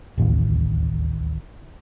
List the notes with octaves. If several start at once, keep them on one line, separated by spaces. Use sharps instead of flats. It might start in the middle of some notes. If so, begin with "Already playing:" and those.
D1 A1 D#2